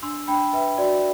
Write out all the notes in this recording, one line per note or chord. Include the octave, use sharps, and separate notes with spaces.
D4 C6 E6
D4 G5 B5
B4 E5 G5
F#4 D5